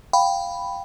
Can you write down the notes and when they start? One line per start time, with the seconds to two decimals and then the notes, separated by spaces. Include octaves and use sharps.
0.13 F5 G5 B5